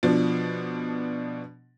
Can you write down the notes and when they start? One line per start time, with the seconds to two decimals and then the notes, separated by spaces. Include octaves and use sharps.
0.03 B2 F3 D4